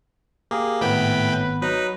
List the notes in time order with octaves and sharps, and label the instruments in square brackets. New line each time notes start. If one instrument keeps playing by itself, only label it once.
[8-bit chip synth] A#3 [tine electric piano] G4 G#4
[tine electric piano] G#1 B3 [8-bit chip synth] A2 G5 B5 [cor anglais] B4
[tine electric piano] F#3 [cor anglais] D#4 [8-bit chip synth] B4